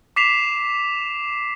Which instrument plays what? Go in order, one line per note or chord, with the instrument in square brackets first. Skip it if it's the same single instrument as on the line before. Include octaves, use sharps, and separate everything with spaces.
[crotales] D6 B6 C7 E7 F7